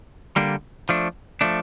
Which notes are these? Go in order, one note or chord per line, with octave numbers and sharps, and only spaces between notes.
D3 G3 A#3 D4
F3 A3 D4
F3 A3 D4